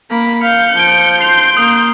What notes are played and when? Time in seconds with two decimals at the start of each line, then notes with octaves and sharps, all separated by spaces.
0.11 A#3 B5
0.43 F5 G6 C#7
0.77 F3 D7 G7
1.21 C6 G6 C7 F7
1.57 A#3 D#6